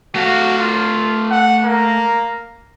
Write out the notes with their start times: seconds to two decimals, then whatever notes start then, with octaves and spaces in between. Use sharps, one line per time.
0.15 A3 F#4 F5
0.59 F4
1.31 F#5
1.65 A#3